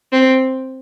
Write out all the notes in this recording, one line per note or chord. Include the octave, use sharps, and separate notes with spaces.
C4